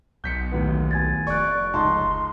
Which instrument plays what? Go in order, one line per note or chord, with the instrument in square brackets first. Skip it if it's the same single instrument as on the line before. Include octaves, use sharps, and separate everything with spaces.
[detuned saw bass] B1 [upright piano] G6 B6 C#7
[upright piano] D#2 A2 B3
[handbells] G#5 G#6 A6
[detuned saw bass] F1 [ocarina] D5 [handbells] C#6 F#6
[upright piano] C#2 D#4 A5 [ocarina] C6